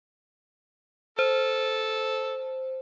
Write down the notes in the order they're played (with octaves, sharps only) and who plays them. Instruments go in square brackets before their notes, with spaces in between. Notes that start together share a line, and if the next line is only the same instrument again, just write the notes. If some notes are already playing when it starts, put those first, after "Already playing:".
[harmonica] A4 [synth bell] C5